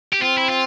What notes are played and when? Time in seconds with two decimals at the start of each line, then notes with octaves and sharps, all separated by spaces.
0.13 G4
0.21 C4 F4
0.38 E4
0.49 F4